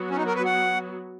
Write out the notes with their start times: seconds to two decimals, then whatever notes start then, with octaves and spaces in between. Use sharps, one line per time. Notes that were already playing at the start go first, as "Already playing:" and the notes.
Already playing: F#3 B3 F#4
0.10 C#4
0.17 D#4
0.27 A#4
0.36 B4
0.45 F#5